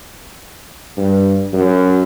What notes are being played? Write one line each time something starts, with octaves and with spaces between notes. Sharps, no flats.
G2
F#2